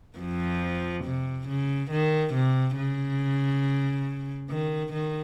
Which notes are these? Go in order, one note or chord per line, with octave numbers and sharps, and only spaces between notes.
F2 F3
C3
C#3
D#3
C3
C#3
D#3
D#3